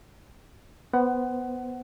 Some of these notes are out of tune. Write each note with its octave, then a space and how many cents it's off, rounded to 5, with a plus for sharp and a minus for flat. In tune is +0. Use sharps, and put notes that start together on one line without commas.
B3 +0 C5 -10 F#5 +20